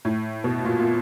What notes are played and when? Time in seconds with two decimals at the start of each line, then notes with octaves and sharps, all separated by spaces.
0.05 A2
0.44 B2
0.65 A#2
0.79 A#2